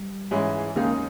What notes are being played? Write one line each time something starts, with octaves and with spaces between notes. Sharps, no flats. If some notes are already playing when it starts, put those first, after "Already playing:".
Already playing: G3
G#2 E3 G#3 C#4 E4
D#2 C#3 G#3 A#3 D#4